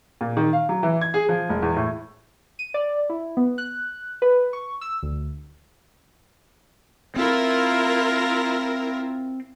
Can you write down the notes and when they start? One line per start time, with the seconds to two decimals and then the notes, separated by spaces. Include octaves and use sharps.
0.21 A#2
0.37 D#3
0.53 F5
0.69 F#3
0.83 E3
1.01 G#6
1.14 G#4
1.29 F3
1.49 E1
1.62 E2
1.76 A2
2.59 D#7
2.74 D5
3.10 E4
3.37 B3
3.58 F#6
4.22 B4
4.53 C#6
4.81 E6
5.03 D2
7.16 C4 E4 F4 A#4